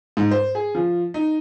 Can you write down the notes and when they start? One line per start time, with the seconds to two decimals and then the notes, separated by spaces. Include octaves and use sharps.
0.17 G#2
0.31 C5
0.55 G#4
0.75 F3
1.14 D#4